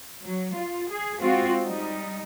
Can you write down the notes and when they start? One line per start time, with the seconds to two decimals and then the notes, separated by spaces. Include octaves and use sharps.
0.23 F#3
0.55 F4
0.90 G#4
1.21 G#3 C4 F4 F#4
1.64 G3 D#4